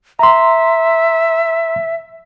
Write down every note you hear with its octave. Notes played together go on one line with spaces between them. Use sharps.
E5 A#5 C6